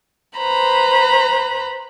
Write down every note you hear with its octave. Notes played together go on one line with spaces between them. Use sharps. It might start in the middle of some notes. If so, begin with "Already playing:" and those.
B4 C5 A#5 B5